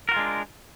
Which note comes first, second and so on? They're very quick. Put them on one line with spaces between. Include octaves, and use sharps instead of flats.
A#4 F#4 F4 G#3 D4